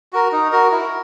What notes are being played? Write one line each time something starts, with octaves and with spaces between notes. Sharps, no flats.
F#4 A#4
D#4
F#4 A#4
E4